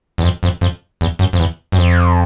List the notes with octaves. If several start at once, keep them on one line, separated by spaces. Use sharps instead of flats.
E2
F2
F2
F2
E2
F#2
F2
E2
F#2
F2